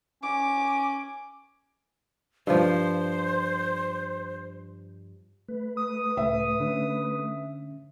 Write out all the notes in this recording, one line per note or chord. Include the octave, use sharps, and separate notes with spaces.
C#4 D6
G2 F3 C5
A3 B4
D#6
C#2 A2 E5
D3 C#4